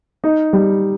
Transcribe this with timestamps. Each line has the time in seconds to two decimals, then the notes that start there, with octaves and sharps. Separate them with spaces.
0.24 D#4
0.53 G3